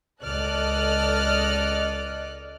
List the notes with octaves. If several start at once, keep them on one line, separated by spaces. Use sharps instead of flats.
C#2 A4 D5 D#5 F6 F#6